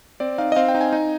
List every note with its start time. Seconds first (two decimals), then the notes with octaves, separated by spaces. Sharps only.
0.20 C4 D5
0.38 D#4 F5
0.52 D#5
0.56 C4 F5
0.68 G5
0.75 D#4
0.81 G#5
0.93 D#4